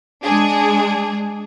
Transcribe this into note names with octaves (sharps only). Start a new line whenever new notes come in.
G#3 D4 G#4